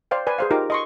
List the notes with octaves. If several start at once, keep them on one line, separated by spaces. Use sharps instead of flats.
C5 D5 F5 G5
B4 D5 G#5
G#4 C5 F5
D#4 F4 G4 A#4 D6
D#5 C6 C#6